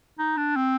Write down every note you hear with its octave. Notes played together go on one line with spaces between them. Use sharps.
D#4
D4
C4